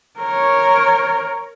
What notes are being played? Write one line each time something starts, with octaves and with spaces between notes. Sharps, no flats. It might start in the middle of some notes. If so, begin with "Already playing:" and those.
A#4 C#5